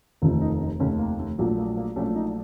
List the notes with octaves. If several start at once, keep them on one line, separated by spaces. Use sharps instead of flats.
F1 D#2 D#3 A3 F4
D#4
D#4
F1 D#2 D#3 A3 C#4
A#3
A3
A#1 A#2 F#3 A3 A#3
A#3
A#3
A#1 A#2 F#3 A3 C#4
D#4